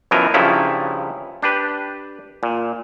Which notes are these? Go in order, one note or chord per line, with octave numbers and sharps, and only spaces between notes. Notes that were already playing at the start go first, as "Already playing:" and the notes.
F#2 B2 E3 F3 A#4 G#5
G2 C#3 F3 F#3 C#4 E4
D4 G4 B4
A#2